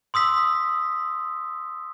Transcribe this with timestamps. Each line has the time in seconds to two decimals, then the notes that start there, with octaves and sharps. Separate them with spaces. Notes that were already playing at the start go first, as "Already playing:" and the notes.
0.14 C6 D#6 E6 B6